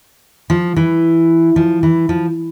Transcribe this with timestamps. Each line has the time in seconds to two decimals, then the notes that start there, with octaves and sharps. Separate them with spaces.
0.50 F3
0.76 E3
1.56 F3
1.83 E3
2.09 F3